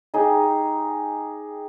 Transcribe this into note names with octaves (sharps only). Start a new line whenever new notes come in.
D#4 G4 G#4